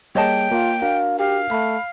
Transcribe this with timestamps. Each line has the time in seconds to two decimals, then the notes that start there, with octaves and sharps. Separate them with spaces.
0.15 G3 A#3 G#4 C#5 D#5 G5 A5
0.52 A#3 F4
0.82 D4 F#4 A#4 F5
1.19 G4 F5
1.51 A3 B5